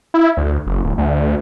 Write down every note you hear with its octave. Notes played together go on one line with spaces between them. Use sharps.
E4
D2
F#1
D1
D2